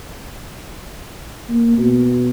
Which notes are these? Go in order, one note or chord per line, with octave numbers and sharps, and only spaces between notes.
A#3
B2